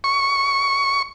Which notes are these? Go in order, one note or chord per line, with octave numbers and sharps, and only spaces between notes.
C#6